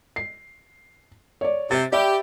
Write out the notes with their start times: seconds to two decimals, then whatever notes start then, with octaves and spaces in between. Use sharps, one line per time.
0.16 C7
1.41 C#5 D5
1.71 C3 A6
1.92 G4 D5 E5 B5